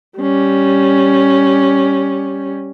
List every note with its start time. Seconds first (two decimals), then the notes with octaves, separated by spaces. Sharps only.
0.19 G3 C#4